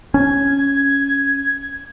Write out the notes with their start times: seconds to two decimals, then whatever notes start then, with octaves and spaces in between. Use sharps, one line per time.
0.14 C#4 G#6